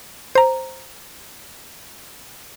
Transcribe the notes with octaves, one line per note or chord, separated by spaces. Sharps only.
C5 A#5